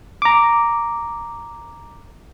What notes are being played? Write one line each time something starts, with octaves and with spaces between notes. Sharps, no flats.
A#5 D6